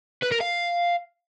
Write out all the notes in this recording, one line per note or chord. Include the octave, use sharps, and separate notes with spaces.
B4
A#4
F5